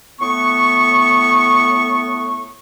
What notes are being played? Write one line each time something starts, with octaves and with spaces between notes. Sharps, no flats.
A2 B3 C#6